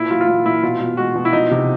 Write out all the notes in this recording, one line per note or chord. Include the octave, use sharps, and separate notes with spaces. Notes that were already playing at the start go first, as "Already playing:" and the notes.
Already playing: A#2 E4
F#3 F4
F4
A#2 E4
A#2 E4
B2 F4
B2
G#3 F#4
B2
E4
F3 D#4
C3